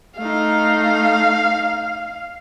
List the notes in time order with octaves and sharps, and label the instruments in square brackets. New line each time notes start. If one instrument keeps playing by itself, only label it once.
[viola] A3 D#4 [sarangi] F5